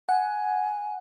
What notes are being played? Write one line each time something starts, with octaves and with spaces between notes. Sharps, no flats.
F#5 G#5